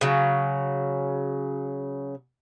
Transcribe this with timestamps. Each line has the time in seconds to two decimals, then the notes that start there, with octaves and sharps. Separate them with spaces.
0.01 C#3 F#3